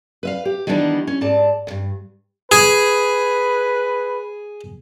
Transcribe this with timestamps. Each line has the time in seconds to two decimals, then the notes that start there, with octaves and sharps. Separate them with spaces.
0.23 B4 E5 F5
0.45 G4
0.67 D#3 E3 G3 B3 D4 D#4
1.07 C#4
1.21 G#2 D5 A5
1.67 D2 G2
2.52 G#4 B4